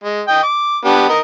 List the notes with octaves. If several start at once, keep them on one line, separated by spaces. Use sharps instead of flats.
G#3
D#5 G5
D6
B3 D4 G4
A#4 D#5